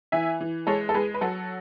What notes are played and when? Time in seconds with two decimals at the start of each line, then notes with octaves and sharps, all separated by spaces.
0.12 E3 E5 G#5
0.40 E3
0.67 G#3 A4 C#5
0.89 A4
0.94 G#3 G#4 B4
1.14 B4
1.21 F#3 F#4 A4